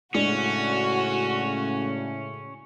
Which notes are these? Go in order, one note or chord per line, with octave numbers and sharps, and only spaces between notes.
A2 C#3 G#3 C#4 D4 F#4